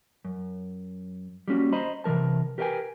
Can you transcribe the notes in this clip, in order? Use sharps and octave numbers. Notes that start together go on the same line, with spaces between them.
F#2
G3 A#3 C#4 F#4
C5 D#5 A#5 B5
C3 E3 F3 A#4 A5
G4 A#4 B4 D5 G5 G#5